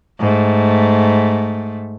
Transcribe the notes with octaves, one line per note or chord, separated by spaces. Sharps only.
G#2 A3